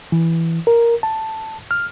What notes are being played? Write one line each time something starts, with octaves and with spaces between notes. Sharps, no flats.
E3
A#4
A5
F6